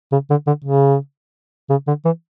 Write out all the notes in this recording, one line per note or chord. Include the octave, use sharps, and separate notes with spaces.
C#3
D3
D3
C#3
C#3
D3
E3